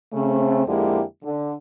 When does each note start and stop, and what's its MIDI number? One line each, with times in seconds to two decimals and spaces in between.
0.13 0.63 49
0.13 0.63 57
0.13 0.63 60
0.67 1.01 41
0.67 1.01 50
0.67 1.01 56
0.67 1.01 58
0.67 1.01 64
0.67 1.01 67
1.24 1.52 50